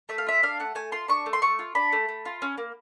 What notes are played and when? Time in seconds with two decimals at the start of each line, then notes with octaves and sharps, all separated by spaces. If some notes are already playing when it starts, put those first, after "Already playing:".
0.09 A3 E5
0.18 F5
0.27 F4 E5
0.43 D4 F5
0.60 A3 F#5
0.75 A3 G#5
0.92 F4 C6
1.08 D4 C#6
1.26 A3
1.33 C6
1.42 A3 C#6
1.59 F4
1.75 D4 B5
1.92 A3
2.08 A3
2.25 F4
2.42 C#4
2.58 A#3